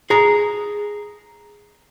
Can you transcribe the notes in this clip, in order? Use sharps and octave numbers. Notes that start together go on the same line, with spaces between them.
G#4 A#5